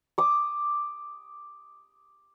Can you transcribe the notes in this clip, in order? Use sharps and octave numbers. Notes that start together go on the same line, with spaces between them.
D6 D#6